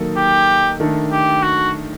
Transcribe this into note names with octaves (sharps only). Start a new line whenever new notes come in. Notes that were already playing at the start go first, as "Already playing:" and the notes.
Already playing: D#3 F#3 A#3 D#4 A4
G4
D#3 A3 D4 A4
G4
F#4